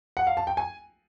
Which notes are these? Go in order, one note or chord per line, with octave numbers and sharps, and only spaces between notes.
F#5
F5
A5
G5
G#5